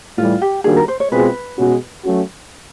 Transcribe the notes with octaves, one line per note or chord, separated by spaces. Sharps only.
A2 E3 G3 F4
G4
D#3 G3 A#3 D4 F#4 G#4
A#4
C5
C#5
B2 G#3 C4 F4 G#4 B4
B2 G#3 C#4 F#4
F#3 A3 C#4 F#4